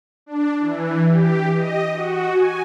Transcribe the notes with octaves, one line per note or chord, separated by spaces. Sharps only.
D4
E3
G4
D#5
F#4
G#5